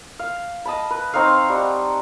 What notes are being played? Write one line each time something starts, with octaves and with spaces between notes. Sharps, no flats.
F5
D#5 A5 B5
B4
C4 D#4 C#5 F5
G3 F#5